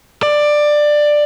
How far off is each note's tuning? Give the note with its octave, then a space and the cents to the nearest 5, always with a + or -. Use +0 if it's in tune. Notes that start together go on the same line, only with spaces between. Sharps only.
D5 +15